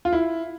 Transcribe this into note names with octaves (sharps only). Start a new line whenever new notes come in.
F4
E4